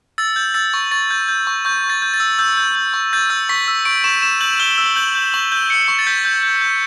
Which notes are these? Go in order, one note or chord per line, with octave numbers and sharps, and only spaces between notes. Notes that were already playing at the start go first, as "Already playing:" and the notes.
E6 A6
G6
E6 A6
C#6
C#6 A6
G6
G6
C#6
C#6 G6
C#6
A6
G6
A6
E6
E6 G6
G6
G6
C#6
G6 A6
E6
C#6 B6
E6
C#6 D7
C#6 E7
C#6 E7
G6 F#7
E6 G7
E6
G6 F#7
G6
C#6 F#7
G6
G6 C#7
C#6
A6
G6 B6
G6
G6
G6